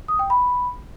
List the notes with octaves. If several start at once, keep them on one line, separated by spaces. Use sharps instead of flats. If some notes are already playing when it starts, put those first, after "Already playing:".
D#6
G5
B5